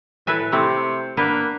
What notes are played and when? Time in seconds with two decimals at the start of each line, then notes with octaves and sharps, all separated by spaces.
0.27 A2 B4 E5 G#5
0.52 C3 A3 C4 E4
1.17 A#3 B3 D4 B4